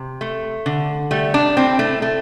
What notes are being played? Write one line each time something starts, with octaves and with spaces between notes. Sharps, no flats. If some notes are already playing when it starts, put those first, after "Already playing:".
Already playing: C3
A3
D3
G3 A3
D4
A2 C4
A3
A3